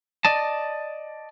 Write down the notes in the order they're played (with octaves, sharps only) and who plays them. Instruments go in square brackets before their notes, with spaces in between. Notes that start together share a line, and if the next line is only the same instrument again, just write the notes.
[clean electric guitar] D5 D#5 A5